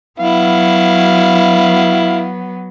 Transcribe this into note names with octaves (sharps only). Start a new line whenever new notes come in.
F#3 B3 E4 F5